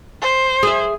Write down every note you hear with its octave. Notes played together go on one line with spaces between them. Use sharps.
C5
G#4 E5